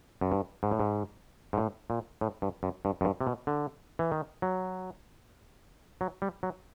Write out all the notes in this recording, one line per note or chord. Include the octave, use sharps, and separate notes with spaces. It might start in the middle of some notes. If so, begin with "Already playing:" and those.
F#2
G2
G#2
A2
G#2
G#2
A2
A#2
A2
G2
F#2
G2
F#2
G2
C3
B2
D3
E3
D#3
F#3
F#3
G3
F#3